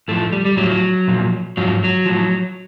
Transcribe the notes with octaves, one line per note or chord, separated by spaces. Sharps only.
A2 F3 A3
G3
G3
A2 F#3
F3
A#2 F3
G#2 F3 F#3
F#3
A2 F3